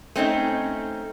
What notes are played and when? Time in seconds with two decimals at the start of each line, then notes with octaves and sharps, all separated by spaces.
0.16 A3 C4 C#4 D#4